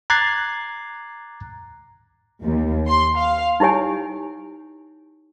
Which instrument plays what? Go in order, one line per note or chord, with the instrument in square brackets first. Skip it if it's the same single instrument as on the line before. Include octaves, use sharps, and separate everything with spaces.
[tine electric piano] A#5 D6 F#6 G#6 A6 C7
[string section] D#2
C6
F5
[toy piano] D#4 E4 G4 C#5 G#5